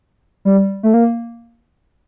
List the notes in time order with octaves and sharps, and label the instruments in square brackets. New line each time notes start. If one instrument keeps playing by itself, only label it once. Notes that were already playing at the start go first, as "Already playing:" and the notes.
[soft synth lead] G3
A3
A#3